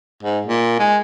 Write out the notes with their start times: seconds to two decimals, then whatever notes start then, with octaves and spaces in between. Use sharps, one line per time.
0.23 G#2
0.47 A#2
0.79 G#3